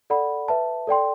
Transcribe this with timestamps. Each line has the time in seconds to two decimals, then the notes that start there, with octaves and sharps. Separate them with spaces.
0.10 A4 D5 F#5 B5
0.48 B4 E5 A5
0.87 A4 D5 G5 C6